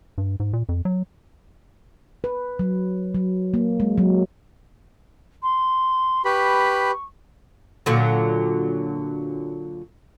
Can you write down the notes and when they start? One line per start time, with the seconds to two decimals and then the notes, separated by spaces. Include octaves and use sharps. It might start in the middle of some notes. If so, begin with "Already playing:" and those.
0.18 G2
0.40 G#2
0.53 A#2
0.69 F2
0.85 F#3
2.24 B4
2.59 F#3
3.15 F#3
3.54 A#3
3.80 G#3
3.98 F#3
5.43 C6
6.25 G4 B4 B5 C#6
7.86 A#2 D3 F#3